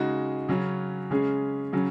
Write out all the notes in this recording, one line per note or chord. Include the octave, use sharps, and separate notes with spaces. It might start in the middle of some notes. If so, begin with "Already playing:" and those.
Already playing: C#3 G#3 D#4 F#4
C#3 F#3 C#4
C#3 G#3 C#4 G#4
C#3 F#3 C#4